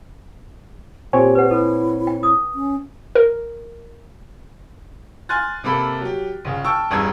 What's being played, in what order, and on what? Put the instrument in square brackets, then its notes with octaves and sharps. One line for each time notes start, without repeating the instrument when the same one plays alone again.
[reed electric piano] A#2 C4 C#5 [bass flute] G4 [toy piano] G#5
[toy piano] B4 F#5
[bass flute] E4 [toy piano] A4 B4
[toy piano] G5
D#6
[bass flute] C#4
[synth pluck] A#4
[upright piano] G#5 C6 F6 F#6 A6
C3 A#3 A4 B5
F#3 G4
A#1 C#3
G5 A5 C#6 E6 F6
E1 A1 G2 A#5 E6 G#6